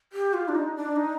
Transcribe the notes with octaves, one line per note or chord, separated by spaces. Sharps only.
G4
F4
D4
D#4
D4
D#4